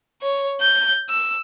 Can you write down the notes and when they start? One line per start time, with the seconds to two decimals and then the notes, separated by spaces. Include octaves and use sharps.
0.22 C#5
0.61 G6
1.10 E6